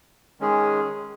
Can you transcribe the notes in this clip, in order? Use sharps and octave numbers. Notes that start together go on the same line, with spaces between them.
D#3 G#3 C#4 G#4